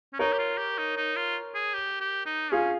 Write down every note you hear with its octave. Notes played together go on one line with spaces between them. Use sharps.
C#4
D#4 A#4 C#5
G4
F4
G4
D#4
D#4
F4
G#4
G4
G4
D#4
C#4 F4 G#4